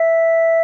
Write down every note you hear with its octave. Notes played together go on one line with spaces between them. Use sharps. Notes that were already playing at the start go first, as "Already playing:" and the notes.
Already playing: E5